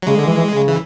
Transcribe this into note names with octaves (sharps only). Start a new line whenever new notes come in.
F#3
C#3 G#3
D3
E3
E3
C#3
E3